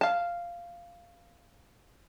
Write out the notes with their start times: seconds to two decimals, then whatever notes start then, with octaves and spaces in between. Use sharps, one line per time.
0.01 F5 A5